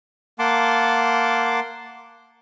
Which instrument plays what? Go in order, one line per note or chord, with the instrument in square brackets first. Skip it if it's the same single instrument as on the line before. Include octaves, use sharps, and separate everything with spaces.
[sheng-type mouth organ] A#3 F#5 A5 C6 D6